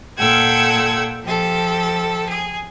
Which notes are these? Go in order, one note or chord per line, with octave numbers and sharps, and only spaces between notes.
A#2 A4 F#5 G5 E6 G#6
F3 G4 A4
G#4